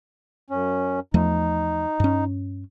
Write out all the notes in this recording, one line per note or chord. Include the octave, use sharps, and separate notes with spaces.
F#2 C#4
E2 F3 A3 D#4
G2 C#4